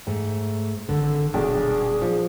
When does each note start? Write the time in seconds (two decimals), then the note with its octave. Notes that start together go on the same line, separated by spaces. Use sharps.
0.07 G#2 A3
0.89 G#1 D3 A4
1.34 D#1 B1 D4 G#4
2.02 F3